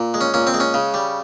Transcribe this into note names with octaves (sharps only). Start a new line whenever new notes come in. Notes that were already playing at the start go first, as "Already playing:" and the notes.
Already playing: A#2
G#3
C#4
A#2 C#4
C4
G#3
C#4
C#3
G3